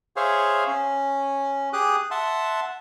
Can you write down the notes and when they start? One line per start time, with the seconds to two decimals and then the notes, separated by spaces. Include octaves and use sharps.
0.16 G#4 C5 C#5 E5 F5
0.67 C#4
1.73 G4 G#4 D6 D#6 F#6
2.11 E5 F#5 A5 C6